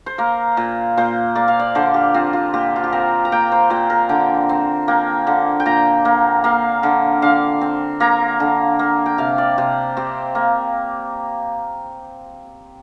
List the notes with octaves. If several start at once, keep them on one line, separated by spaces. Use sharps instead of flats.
C5
A#3 A#4
A#2
A#2 C5
A#3 D5
F5
D5
D3 C5
G4
C4 F4
F4
A#2 G4
F4
G4
C4 A#4
A#5
A#3 G5
C5
A#2 C5
A#4
D3 G5
C4
A#3 G5
D3
G5
A#2 A#5
A#3
A#3 F5
D3
D3 F5
C4
A#3 A#5
D3
A#3
G5
C3 F5
D5
C3 C5
C4 G4
A#3